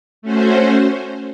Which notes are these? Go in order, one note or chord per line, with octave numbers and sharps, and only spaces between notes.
A3 C#4 F#4 C5